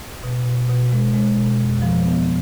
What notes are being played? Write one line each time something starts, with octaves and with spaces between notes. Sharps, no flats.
B2
B2
B2
G#3
G#3
B2
F2
F3
B3